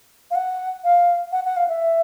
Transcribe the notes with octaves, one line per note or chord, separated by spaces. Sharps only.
F5
F#5
F5
F#5
F#5
F5
E5